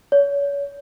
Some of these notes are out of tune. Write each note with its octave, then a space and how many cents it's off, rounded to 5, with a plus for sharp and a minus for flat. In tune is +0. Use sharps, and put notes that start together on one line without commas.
C#5 +35